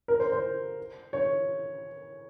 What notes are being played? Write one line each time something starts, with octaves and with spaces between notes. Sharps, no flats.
A#4
C5
C5
C#5